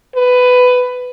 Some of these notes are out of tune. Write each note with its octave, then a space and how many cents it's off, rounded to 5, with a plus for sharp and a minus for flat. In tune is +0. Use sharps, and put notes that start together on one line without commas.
B4 +15